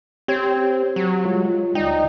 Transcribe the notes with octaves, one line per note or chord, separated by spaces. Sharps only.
C4 G4 C#5 G#6
F#3
G3 G#3 F4
D2 D#4 D5 G5